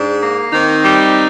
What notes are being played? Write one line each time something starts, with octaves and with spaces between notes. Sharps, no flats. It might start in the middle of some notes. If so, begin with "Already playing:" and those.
Already playing: G#2 D4
A#3
D#3 C4 D#4
G3